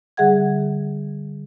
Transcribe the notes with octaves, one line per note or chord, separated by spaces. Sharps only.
D3 G3 G#4 E5 F#5 G#6